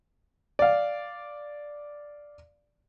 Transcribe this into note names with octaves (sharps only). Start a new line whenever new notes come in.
D5 F5